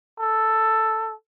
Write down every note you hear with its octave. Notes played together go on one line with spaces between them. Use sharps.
A4